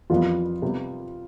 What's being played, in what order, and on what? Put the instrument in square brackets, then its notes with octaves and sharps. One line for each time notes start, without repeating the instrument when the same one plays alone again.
[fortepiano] F2 E3 G3 B3 [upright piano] F4
[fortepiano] C3 G3 B3